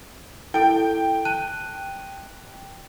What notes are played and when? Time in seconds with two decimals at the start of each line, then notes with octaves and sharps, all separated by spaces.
0.54 E4 A4 G5 D7
1.25 A5 F#6 D#7